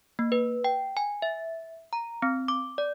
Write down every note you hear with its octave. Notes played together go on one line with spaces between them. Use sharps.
A#3
B4
G5
G#5
E5
A#5
C4
D6
D5